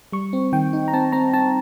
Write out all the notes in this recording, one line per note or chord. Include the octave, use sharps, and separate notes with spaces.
G3 C#6
C4
D#3 G5
D#4
A#5
C4 A5
C4 A#5
C4 A5